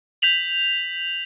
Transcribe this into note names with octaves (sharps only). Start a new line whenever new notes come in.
G6 B6 F7 F#7